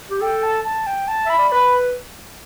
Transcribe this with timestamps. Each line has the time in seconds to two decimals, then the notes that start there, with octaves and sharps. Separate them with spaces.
0.10 G4
0.21 A4 G5
0.43 A5
0.64 A5
0.87 G5
1.08 A5
1.26 E5 B5
1.38 D5
1.51 B4 B5